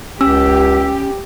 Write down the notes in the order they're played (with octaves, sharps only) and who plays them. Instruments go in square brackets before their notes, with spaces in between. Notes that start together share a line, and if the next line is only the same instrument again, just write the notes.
[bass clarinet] C#2 [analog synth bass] C#4 [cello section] G4 [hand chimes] E6